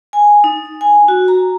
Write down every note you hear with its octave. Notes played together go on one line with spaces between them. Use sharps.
G#5
D#4
G#5
F#4
A#5